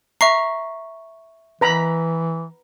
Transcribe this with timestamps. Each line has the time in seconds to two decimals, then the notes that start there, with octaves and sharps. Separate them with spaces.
0.21 E5 A#5 C#6 C7
1.61 E3 B4 A#5 B5